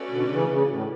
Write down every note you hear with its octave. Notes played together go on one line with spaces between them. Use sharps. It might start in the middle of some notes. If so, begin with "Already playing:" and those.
Already playing: A3 C#4 F#4 B4 D5
B2 D3
C#3 E3
C#3
A2